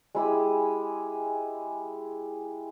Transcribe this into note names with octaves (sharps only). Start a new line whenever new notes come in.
G#3 E4 G4 G#4